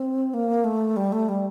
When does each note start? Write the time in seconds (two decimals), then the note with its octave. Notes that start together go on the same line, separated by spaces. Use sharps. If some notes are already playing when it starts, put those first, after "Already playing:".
Already playing: C4
0.34 A#3
0.64 A3
0.96 G3
1.12 A3
1.29 G3